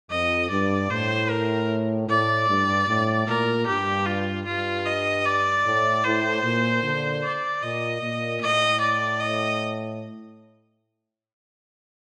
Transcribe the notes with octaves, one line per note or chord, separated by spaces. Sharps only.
F2 D#5
G2 D5
A2 C5
A#4
A2 D5
G2
A2
A#2 A#4
G2 G4
F4
G2 F4
D#5
D5
A2
A2 C5
A#2
A#2 D3
D5
A#2 D#5
A#2
A2 D#5
D5
D#5